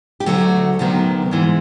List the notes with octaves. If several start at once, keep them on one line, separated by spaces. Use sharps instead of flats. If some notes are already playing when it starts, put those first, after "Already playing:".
G4
D2 D3 F#3 A3 F#4
D2 C3 D#3 F#3 B3
G#2 E3 G#3